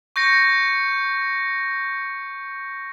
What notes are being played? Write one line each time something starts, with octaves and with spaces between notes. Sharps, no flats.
C#6 G6 A#6 C#7